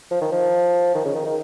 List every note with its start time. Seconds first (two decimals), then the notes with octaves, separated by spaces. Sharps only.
0.11 F3
0.21 D#3
0.32 F3
0.95 D#3
1.05 C#3
1.15 D#3
1.26 D#3